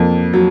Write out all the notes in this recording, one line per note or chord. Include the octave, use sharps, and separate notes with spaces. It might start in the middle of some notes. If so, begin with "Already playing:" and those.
Already playing: F2 A#3
F#3